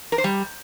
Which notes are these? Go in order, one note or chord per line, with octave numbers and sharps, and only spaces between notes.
A#4
C5
G3